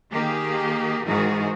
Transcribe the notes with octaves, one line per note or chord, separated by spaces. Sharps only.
D#3 A#3 G4 G#4
G#2 D#3 E3 F#4 G#4 A#4